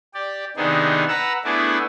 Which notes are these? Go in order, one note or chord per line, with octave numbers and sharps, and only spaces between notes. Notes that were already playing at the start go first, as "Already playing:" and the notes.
G4 D5
C3 D#3 B3 D4 D#4 G#4
B4 F#5 A#5 E6
A3 B3 D4 E4 G#4 D5